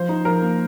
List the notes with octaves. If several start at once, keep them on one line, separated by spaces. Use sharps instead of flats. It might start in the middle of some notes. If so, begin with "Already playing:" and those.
Already playing: F3 C5
D#4
F3 A#4
A#3